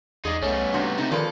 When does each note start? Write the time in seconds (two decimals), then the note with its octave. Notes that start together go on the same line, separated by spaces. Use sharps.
0.25 E2 G#3 D#4 G#4 D5 D#5
0.43 C2 A3 B3 C#4
0.74 G#2 C3 D4 F#4
0.98 C3 A3 C4 D#4
1.12 A#2 D#3 F3 G#3 A4 B4